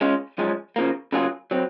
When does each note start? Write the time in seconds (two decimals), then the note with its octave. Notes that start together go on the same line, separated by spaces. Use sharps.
0.01 C#2 C#3 G#3 C#4 F4
0.38 F#2 F3 G#3 C#4
0.76 C#3 F3 A#3
1.12 C#3 F#3 A#3 F4 G#4
1.51 F#3 C4